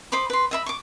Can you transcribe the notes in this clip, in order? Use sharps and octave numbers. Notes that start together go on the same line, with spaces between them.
C5 D#5 B5 D6
B4 C6
D#5 E5 B5
C#6 D6